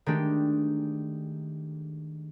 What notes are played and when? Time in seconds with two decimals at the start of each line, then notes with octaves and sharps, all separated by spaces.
0.06 D#3 G#3 A3 D4 G4